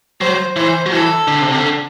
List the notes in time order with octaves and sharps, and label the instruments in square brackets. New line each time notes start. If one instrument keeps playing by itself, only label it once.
[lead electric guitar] F#3 [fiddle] C5
[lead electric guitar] E3 [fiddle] C5
[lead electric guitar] F#3
[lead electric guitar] E3 [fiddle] A4
[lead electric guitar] D3
C3
D3